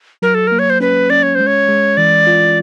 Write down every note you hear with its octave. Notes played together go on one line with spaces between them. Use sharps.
F#3 A#4
A4
A#3 A#4
C#5
C5
C#4 B4
C#4 D5
C#5
G#3 C5
C#5
G#3
E3 D5
F4